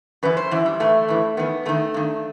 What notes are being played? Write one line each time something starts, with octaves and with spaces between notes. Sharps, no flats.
F#2 E3 B4
C5
F#2 E3 E4
G3
A2 E3 A3
A2 E3
E2 D#3 B3
E2 D#3 A3
G2 D#3